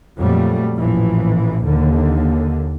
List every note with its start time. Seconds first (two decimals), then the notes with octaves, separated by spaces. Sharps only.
0.19 F2 A#2 F#3 G3 A3
0.76 A1 A#2 E3 F3
1.63 D#2 D3